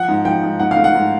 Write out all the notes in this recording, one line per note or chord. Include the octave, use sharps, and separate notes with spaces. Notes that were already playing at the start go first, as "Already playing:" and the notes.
Already playing: F3 F#5
G#2
F3 G5
G#2
G#2 F#5
F5
A3
F#5
G#2